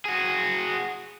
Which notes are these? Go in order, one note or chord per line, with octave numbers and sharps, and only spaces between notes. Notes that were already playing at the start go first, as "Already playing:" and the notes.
F#4 G#4